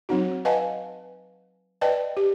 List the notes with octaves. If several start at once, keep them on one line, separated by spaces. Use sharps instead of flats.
F#3 C4 D#4 F#4
B4 D#5 F5 F#5 G#5 A5
B4 D5 D#5 G5 A5
G4